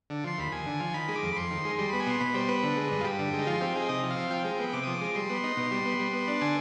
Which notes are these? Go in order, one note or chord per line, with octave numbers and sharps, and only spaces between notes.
D3
F3 C6
D#2 B5
D#2 G#5
D3
F3
D#3 B5
G#3
D6
F2
B5
F2 C6
D#3
G#3
G3 C6
B3 B5
G#5
B2 C6
B2 B5
G3 C5
B3 B4
D3
G#3
G2
F4
G2 G4
D3
G#3
D#4
F3 F4
C4 G4
D#4 G#4
C3 D#5
F3
F5
C4
F3 G5
G#3
B3
C3 D6
F3 D#6
D6
G#3
G3 C6
B3
D#4
B2
G3
B3
G3
B3
D4
D3 G#5